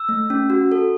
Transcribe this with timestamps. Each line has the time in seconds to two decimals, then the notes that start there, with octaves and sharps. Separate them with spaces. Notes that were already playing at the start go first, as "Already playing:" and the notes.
Already playing: E6
0.09 A3
0.30 C#4
0.50 F#4
0.72 A4